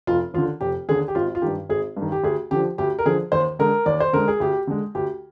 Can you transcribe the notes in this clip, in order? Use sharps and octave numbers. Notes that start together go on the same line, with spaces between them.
F1 F4
D#2 D3 F4
F1 G4
D#2 D3 G#4
G4
G#1 F4
F4
G2 D#3 G4
G#1 G#4
G2 D#3
G4
D2 G#4
D3 F3 G4
D2 G4
A#4
D3 F3 G#4
D#2 C5
D3 G#3 A#4
D#2 D5
C5
D3 G#3 A#4
G#4
D2 G4
D3 G#3
D2 G4